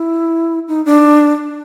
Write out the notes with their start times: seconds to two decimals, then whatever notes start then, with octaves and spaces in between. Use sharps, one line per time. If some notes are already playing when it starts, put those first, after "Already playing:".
Already playing: E4
0.68 D#4
0.86 D4